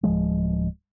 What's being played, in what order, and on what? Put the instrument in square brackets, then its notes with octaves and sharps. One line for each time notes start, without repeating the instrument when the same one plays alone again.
[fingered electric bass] D1 B1 F3 G#3